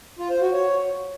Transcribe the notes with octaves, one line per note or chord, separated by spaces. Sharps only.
F4
C5
F#4
C#5